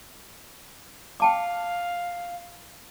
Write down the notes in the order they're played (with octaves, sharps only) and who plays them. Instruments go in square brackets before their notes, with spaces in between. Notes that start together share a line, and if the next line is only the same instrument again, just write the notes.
[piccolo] F5 [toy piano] G5 A5 D6